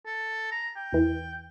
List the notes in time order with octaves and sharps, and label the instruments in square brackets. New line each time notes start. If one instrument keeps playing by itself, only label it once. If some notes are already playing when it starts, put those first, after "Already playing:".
[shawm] A4
A#5
G5
[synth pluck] E2 E3